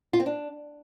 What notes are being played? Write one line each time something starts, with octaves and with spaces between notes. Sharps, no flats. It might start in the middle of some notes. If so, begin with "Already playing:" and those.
F4
C4
D4